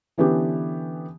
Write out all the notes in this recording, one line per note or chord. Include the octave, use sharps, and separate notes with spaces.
D3 E3 B3 C#4 G4